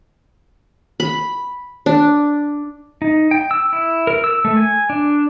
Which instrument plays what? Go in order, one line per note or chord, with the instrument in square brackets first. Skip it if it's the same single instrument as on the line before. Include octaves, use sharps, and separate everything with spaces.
[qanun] B5
D4
[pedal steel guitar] D#4
G5
E6
E4
A#4
E6
A3
G#5
D4